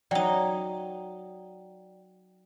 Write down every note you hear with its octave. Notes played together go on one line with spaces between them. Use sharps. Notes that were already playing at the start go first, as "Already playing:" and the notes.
F#3 D#4 D5 G5